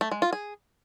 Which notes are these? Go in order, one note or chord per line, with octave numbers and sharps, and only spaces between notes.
A3
G#3
F4
G#4